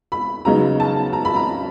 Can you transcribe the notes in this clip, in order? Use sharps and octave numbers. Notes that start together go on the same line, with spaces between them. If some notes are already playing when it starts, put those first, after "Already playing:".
B5
C#3 F#3 B3 D#4 A#5
A5
A#5
B5
A#5